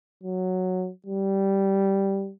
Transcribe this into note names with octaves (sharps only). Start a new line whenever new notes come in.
F#3
G3